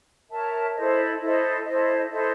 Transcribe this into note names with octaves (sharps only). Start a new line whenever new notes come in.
A#4 C#5 E5 A5
E4 A4 C5 D#5
E4 A4 C5 D#5
E4 A4 C5 D#5
E4 A4 C5 D#5